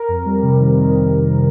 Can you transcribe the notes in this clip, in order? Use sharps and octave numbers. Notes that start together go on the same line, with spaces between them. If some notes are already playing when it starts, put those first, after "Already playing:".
Already playing: A#4
F2
G3
C3
D#3